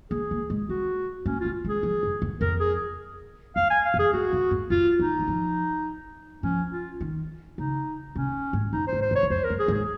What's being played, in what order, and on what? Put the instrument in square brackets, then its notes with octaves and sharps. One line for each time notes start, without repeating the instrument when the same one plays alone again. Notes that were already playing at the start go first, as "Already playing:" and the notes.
[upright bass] A#3 [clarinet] G#4
[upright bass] A#3
G#3
[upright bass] C4 [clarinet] F#4
[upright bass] A#3 [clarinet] C#4
[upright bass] C4 [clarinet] F4
[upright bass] G#3
[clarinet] G#4
[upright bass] F3
F#2
F2
[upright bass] F2 [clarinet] A#4
[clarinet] G#4
[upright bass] F2 [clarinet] F5
[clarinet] G#5
F5
[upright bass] F2
[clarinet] G#4
[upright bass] F2 [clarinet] F#4
[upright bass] F#2
F#2
[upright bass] F2 [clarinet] F4
[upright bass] D#3 [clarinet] D#4
[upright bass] F#3
F3
[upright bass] F3 [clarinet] C#4
[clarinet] F4
[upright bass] D#3
[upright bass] C#3 [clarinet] D#4
[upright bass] C3 [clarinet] C#4
[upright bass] G#2
[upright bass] F#2 [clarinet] D#4
[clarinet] C5
[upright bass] G#2
[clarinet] C5
[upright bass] F#2
[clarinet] C#5
[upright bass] F#2
[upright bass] F2 [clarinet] C5
[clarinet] A#4
[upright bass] F#2
[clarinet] G#4
[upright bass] G#2
[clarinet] G#4